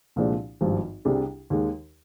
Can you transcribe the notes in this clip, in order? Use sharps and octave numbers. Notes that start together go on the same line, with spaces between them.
C2 A#2 F3 G#3 D4
G#1 G2 F3
C2 C3 G3 D4 G#4
D#2 D#3 G#3